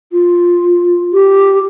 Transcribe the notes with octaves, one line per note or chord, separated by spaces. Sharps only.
F4
G4